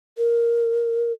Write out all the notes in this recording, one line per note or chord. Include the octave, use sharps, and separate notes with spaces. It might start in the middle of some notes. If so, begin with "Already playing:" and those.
A#4